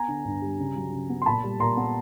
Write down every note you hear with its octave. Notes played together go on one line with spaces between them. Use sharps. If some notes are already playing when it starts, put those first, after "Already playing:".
Already playing: B3 G#5 A#5
D3
G2
G3
C#3
F#3
C#3
B3
C6
A#2 A5 B5
G3
A#2 A#5 C6
B3